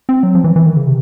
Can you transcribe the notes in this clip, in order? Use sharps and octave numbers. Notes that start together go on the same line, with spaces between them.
C4
F#3
F3
E3
E3
D#3
C#3
C3